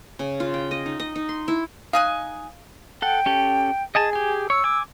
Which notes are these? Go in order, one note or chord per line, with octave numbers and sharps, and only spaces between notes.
C#3
F4
G5
D#5
D#4
D#5
D#4
C6
E4
D#4 F5 G#5 F#6
A4 F#5 G5
C#4 G4 A4
G#4 D#5 G#5 A5
G4 G#5
C#5 E6
G#5 D6